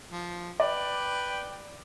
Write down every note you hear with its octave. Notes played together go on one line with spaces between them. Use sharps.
F3
B4 D5 G5